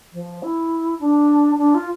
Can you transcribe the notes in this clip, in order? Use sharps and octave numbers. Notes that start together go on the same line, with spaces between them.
F3
E4
D4
D4
F4